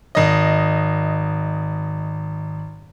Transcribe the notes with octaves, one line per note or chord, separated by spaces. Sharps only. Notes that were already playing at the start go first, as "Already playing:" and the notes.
G#1 D#5